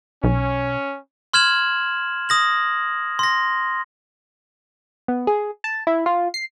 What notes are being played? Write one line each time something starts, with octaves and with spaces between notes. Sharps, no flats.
B1 C#4
C6 F6 G#6 E7 F#7
D#6 A#6 F#7
C6 A#6
B3
G#4
A5
E4
F4
C7